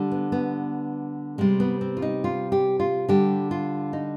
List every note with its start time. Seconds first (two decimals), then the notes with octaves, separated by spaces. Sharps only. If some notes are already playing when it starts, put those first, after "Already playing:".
Already playing: D3 G3
0.12 B3
0.32 B3
1.38 C3 G3 G#3
1.60 B3
1.81 C4
1.97 F4
2.02 D#4
2.24 F4
2.52 G4
2.80 F4
3.09 D3 G3 G4
3.51 F4
3.93 D#4